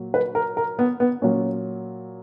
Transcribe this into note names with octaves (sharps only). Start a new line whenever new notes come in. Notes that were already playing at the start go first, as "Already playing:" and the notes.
Already playing: A#2 F#3
B4
A#4
A#4
B3
B3
A#2 F#3 C#4